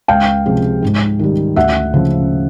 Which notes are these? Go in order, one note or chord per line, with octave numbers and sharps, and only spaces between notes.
C#2 F5 G5
C3 F3 G#3
G#2
D#3 G3
D2 E5 F#5
C#3 F3